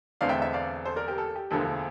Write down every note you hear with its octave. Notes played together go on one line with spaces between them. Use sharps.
E1 E2 D3 A3 C4 D5 F5
E5 G5
E5
D5 F5
A4 C5
A#4 D5
G4 A#4
A4
G4
E1 D2 D3 F3 A#3 A4